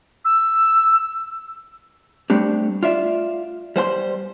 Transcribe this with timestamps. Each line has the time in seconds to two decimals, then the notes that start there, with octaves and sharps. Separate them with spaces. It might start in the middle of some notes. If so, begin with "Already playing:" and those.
0.25 E6
2.30 G3 A3 C4 D4 G4
2.83 F4 D5 E5
3.76 G3 C5 G5 C6